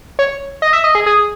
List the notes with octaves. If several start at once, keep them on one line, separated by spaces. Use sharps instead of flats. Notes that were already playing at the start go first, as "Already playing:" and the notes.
C#5
D#5
E5
D#5
G#4
G#4